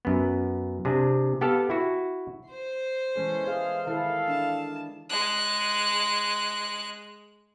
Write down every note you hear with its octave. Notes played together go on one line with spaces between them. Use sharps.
F#2 B3
C3 D4 G#4
B3 G4 A4 F5 A5
E4 F#4
C5 C6
E3 G#3 C#4 A4
G#4 F5
D#3 E4 A4 F5
D4 A5
G#3 F#6